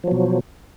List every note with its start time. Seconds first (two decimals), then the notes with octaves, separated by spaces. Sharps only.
0.04 F3
0.08 F#3
0.11 B2